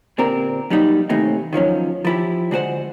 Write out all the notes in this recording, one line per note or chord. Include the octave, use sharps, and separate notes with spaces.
A#2 D3 C4 G4 A#4
F#3 G3 A#3 D#4 F#4 G4
D#2 A2 C3 E3 A3 D#4
D#3 F3 F#3 C#4
F3 E4 G4
D3 G#3 F#4 G#4 C5 F#5